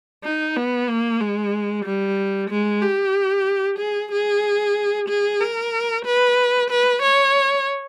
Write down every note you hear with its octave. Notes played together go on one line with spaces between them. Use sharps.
D#4
B3
A#3
G#3
G3
G#3
G4
G#4
G#4
G#4
A#4
B4
B4
C#5